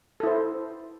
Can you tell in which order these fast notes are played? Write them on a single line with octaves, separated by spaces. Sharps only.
A4 E4 C5